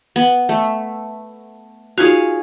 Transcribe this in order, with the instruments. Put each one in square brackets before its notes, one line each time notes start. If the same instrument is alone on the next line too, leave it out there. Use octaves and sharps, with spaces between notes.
[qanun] B3
A3
[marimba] D#4 F4 F#4 [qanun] G#4 C#5 F5